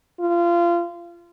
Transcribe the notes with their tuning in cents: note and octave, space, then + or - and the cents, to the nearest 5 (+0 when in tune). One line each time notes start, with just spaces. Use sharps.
F4 -25